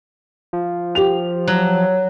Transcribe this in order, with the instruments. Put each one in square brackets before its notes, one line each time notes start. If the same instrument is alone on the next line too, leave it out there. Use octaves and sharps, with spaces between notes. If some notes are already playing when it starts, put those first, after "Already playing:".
[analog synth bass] F3
[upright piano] G4 F7
[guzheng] F#3